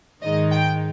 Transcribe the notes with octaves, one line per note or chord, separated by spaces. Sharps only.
G#2 D#3 G#3 D#4 D#5
G5